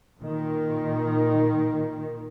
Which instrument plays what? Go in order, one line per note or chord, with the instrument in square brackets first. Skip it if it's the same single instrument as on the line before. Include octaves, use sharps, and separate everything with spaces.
[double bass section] A#2 D#3